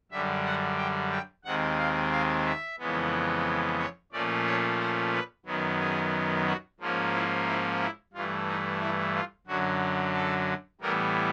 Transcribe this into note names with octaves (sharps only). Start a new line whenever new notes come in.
F#2 D3 G3 E5
F#5
G5
G5
D#2 D#3 G#3 C4 F#5
F5
F5
E5
F2 C#3 E3 G#3 B3
C#5
A#2 F3 A3 C#4 D5
C#5
C5
B4
F#2 D#3 F#3 B3
G#4
F#4
G#2 F3 A#3 C#4
E4
E4
E4
G2 E3 A3 F4
D#4
E4
F4
F#2 D3 F#3 F#4
A4
A2 E3 G3 B3 A#4